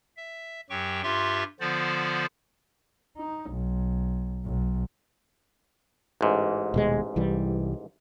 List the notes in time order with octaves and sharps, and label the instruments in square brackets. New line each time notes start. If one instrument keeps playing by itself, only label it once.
[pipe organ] E5
F#2 F#3 G4 G5 C#6
G2 F4 G4 E5 C6 C#6
D3 F3 B3 F4 C5 D5
[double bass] D#4
B1
B1
[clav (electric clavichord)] A1 G#2
[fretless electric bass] D#1 B2 G#3
C2 E3 G3